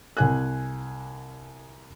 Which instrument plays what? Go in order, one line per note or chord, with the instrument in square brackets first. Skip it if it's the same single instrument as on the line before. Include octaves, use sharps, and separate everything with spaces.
[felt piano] C2 G#5 F#6